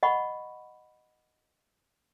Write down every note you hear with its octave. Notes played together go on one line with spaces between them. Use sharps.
D#5 F#5 B5 C#6